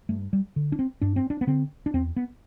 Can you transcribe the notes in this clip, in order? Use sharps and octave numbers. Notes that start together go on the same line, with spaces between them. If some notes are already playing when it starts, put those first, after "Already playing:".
G2 A3
G3
D3
D4
C4
G2 D4
C4
D4
B3
D3 C4
D4
E2 C4
B3